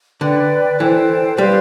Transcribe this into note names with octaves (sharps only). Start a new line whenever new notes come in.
D3 B4 D5 G5
E3 A4 C5 G5
G3 B4 F5 C6